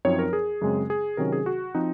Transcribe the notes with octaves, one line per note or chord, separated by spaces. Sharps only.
F#2 F3 C4 D#4 C#5
A#4
G#4
F#2 C#3 G#3 C4
G#4
C3 D#3 F#3 C#4 A#4
G#4
F#4
F3 C4 D#4